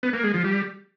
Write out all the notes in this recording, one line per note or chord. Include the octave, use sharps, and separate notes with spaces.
B3
A#3
G#3
F3
G3